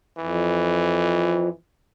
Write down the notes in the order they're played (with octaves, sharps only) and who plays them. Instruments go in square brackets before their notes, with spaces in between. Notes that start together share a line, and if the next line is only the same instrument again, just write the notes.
[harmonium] F2 [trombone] E3